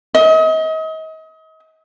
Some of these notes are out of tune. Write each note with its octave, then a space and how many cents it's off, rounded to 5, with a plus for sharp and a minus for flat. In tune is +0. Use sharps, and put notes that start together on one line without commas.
D#5 +35